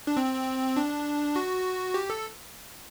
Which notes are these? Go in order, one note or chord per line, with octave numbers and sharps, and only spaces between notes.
D4
C4
D4
F#4
G4
A4